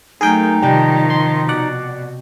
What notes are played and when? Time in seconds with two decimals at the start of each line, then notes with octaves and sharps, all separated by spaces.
0.21 F#3 A3 D#4 G#4 A#4 G5
0.62 C3 D#3 F3 G3 G5 A5
1.10 C6
1.49 B2 D5 F#5